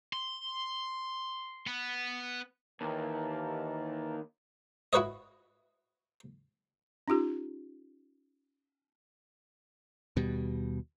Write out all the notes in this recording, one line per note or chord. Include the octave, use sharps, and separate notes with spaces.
C6
B3
D#2 E3 A#4 A5
E4 F#4 B4 C#5 D#5
C#4 D#4 F4 G4
D#2 B2 G3